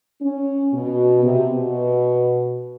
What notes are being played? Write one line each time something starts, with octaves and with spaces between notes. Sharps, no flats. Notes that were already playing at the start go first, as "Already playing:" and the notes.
C#4
B2
C3
B2